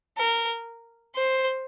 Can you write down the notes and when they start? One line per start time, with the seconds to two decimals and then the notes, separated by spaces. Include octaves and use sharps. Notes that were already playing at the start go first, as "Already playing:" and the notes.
0.18 A#4
1.16 C5